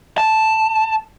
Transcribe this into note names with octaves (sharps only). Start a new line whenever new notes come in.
A5